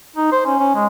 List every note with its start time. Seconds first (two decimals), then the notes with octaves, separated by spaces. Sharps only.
0.16 D#4
0.32 C5
0.46 C#4
0.60 C#4
0.75 G#3